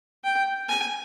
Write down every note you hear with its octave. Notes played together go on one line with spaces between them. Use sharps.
G5
G#5